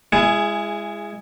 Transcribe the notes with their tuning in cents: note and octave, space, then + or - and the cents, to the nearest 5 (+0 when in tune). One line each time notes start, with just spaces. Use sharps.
G#3 -15 E4 +30 G#4 +0